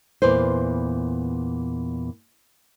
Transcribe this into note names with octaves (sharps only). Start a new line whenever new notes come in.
E2 A#2 B4 C5